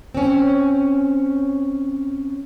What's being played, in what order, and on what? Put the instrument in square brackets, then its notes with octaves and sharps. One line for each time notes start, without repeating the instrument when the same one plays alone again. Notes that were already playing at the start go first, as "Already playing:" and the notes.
[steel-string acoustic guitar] C4 C#4